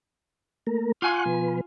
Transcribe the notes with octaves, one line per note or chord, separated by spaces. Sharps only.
A3 A#3 A#4
F4 F#5 G#5 C#6 F#6
B2 F3 B4